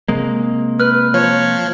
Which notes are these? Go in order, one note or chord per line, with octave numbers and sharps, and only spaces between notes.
C3 G#3 A#3
B4 F6 F#6
F3 C#5